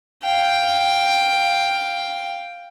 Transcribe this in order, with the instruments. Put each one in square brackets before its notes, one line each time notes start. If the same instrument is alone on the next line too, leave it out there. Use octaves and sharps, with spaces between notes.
[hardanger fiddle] F5 G5